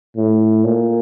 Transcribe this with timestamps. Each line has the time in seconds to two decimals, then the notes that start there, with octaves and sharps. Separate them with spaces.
0.16 A2
0.64 A#2